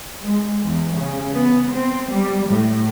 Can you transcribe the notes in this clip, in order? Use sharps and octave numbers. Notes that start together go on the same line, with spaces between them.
G#3
E2
C#3
B3
C4
G3
A2